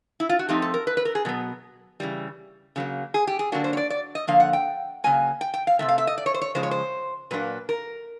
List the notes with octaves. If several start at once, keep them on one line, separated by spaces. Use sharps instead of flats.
E4
F4
F#4
F3 A3 C4 D#4 G4
A4
A#4
B4
B4
A#4
G#4
B2 F#3 B3
C#3 E3 G3
C#3 F#3 A#3
G#4
G4
G#4
D3 F#3 A#3 D4 F#4
C5
C#5
D5
D5
D#5
D3 F3 A#3 F5
F#5
G5
C#3 F#3 A#3 G#5
G5
G5
F5
C3 E3 A3 E5
F5
E5
D#5
D5
C#5
C5
C#5
C#3 F3 G#3 C5
C#5
C5
A#2 F#3 A#3 D4 B4
A#4